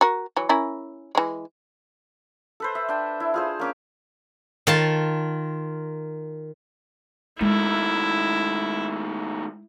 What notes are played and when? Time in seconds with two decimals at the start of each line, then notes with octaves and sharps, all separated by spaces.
0.01 F#4 A#4
0.37 E3 F#3
0.49 C#4 E4 A#4
1.15 E3 G#3
2.60 A4 B4 C5
2.75 E5
2.89 D4 G5
3.20 E4
3.34 F4 G#4 C5
3.59 A#3 C#4 D6
4.67 D#3 F4 A5
7.41 D#3 G#3 A3 E4